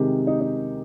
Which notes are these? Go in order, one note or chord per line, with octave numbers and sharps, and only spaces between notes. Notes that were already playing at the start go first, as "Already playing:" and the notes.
Already playing: C3 D#3 G#3 G4
D#4
D#4